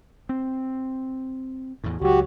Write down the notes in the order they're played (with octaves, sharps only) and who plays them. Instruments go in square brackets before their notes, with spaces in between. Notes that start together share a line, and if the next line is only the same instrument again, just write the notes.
[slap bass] C4
E2 A2
[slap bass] C#2 F#3 [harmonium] F#4 G4